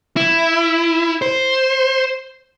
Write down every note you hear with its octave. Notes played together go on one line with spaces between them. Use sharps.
E4
C5